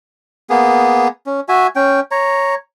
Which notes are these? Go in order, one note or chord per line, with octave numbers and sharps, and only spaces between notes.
A#3 B3 G#4
C#4
F#4 E5 G#5
C#4 G5
C#5 A#5